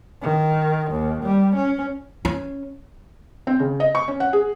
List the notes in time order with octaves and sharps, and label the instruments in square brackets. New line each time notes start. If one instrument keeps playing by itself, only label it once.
[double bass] D#3
D#2
G3
C#4
[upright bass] C#4
[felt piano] C4
C#3
D#5
C#6
C#4
F#5
G#4